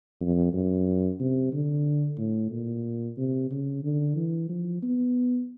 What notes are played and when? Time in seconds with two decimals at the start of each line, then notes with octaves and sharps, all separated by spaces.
0.21 F2
0.53 F#2
1.20 C3
1.53 D3
2.18 A2
2.51 A#2
3.18 C3
3.51 C#3
3.83 D3
4.16 E3
4.50 F3
4.83 B3